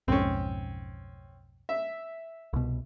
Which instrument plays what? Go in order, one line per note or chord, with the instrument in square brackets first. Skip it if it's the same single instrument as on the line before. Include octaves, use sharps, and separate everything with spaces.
[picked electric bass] B1 F2 G#2 [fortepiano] C4 C#4
[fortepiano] E5
[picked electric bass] C2 B2